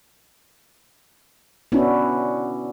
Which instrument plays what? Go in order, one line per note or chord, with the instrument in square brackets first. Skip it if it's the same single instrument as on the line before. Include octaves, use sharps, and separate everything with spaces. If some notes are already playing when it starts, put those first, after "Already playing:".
[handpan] B3 C#4 D4 E4 F#4